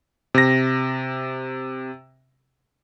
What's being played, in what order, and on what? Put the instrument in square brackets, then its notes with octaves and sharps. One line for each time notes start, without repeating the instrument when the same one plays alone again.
[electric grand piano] C3 A#6